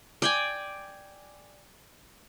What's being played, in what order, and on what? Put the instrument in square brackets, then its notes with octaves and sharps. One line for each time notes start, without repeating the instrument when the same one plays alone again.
[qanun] D5 G5 G#5